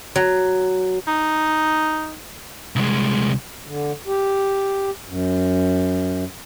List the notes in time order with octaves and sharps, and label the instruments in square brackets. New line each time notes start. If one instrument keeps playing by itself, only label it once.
[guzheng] F#3
[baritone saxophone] D#4
[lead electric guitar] C2 G#3
[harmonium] D3
G4
F#2